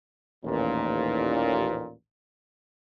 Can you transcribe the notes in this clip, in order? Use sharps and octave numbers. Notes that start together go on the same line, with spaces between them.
A1 D#2 A#2